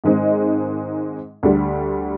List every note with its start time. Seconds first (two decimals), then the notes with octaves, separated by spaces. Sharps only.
0.04 G#2 D#3 G#3 C4 D#4
1.43 D2 D3 G3